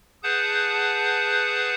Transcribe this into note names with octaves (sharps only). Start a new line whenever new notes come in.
G#4 B4 F#5 A5 G6